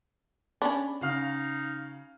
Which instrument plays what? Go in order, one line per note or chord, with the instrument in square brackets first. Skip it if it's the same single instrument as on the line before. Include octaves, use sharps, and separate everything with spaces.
[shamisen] C#4 D4 [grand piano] B5
[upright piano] C#3 [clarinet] D#4 [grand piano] F#4 F5 F6